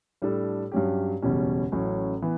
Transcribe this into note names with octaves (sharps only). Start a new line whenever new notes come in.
A2 G3 D4 A4
G2 F#3 C#4 G4
F#1 E2 B2 G3 C#4
A1 A2 F#3 C#4
E3 B3